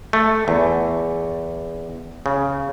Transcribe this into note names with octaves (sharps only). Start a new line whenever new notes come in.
A3
E2
C#3